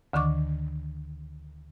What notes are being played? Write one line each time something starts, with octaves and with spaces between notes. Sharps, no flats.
D2 D3 D#3 C#6 D6